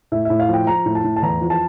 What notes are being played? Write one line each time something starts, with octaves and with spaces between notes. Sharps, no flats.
A2 E5
A2 E5
F5
F3 G5
F3 A#5
A2
A5
A2
A5
E2 A#5
F3
A5